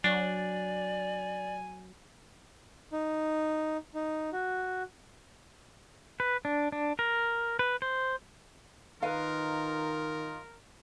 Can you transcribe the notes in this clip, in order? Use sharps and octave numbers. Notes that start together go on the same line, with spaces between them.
F#3 D4 D5 G#5
D#4
D#4
F#4
B4
D4
D4
A#4
B4
C5
D#3 D#4 F4 A#4 B4 F5